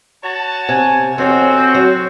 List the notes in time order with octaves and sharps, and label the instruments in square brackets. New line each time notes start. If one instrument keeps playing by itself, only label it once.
[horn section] F#4 C#5 A5
[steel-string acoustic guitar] C3 [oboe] G#5
[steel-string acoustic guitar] F2 C#5 G#5 [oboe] C4 [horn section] F#4
[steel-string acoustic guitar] F#3